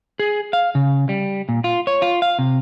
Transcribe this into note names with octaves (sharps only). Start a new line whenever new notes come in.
G#4
F5
C#3
G3
A#2
F4
C#5
F4
F5
C3